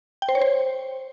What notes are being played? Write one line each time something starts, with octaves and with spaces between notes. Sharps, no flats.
G5
C5
C#5
C5